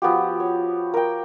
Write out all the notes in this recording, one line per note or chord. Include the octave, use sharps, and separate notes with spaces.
F3 B3 F#4 G4
C#5
A#4 G5